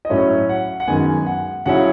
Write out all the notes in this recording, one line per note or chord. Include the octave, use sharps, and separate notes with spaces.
D#5
A2 F#3 A3 C#4 E4 C#5
F#5
F#5
F#2 D#3 G#3 B3 G#5
F#5
C#3 F#3 C#4 E4 F#5